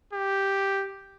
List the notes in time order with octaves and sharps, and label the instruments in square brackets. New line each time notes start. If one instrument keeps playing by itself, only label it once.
[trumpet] G4